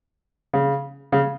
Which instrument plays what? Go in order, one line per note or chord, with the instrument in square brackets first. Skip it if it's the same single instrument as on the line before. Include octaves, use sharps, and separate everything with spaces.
[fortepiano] C#3
C#3